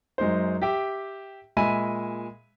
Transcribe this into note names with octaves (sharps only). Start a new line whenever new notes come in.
F#2 G#3 D#4 C5
G4 E5 G5
A#2 G#3 E5 G#5 B5 D#7